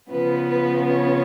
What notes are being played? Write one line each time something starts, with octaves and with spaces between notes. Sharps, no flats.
C#3 F3 B3 B4
B4
C#5